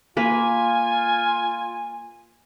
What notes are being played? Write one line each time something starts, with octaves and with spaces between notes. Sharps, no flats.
A#3 F4 B4 G#5